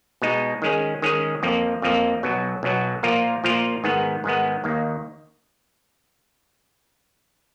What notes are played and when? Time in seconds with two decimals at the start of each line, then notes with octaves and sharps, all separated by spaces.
0.22 B2 G#3 D#4
0.62 D#3 G#3 C#4 G#4
1.02 D#3 G#3 C#4 G#4
1.43 F2 F3 A#3
1.82 F2 F3 A#3
2.23 B1 B2 F#3
2.63 B1 B2 F#3
3.03 A#2 F3 A#3 F4 A#4
3.44 A#2 F3 A#3 F4 A#4
3.84 G#2 D#3 G#3 B3
4.24 G#2 D#3 G#3 B3
4.64 D#2 D#3 A#3